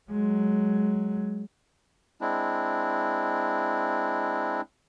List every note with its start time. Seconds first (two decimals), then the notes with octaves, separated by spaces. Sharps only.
0.10 F#3 G#3
2.21 G#3 C4 D4 E4